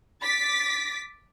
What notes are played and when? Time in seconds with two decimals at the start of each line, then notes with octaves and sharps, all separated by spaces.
0.21 D6 A6 B6